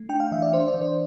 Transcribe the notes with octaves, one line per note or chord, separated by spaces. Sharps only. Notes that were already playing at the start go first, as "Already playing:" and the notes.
Already playing: A3
D4 G5
F5
E3 E5
D5
D4 C5
D5
E3
C5